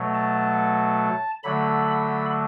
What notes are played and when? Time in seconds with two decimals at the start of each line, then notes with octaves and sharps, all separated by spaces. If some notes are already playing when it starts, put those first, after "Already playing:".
Already playing: B2 F#3 A3
0.15 A5
1.43 D3 F#3 A3 B5
1.87 B5